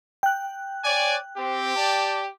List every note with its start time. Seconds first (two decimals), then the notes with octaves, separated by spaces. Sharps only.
0.23 G5 F#6
0.84 C#5 D5 G#5
1.37 C4 G4
1.76 D5 G5 A5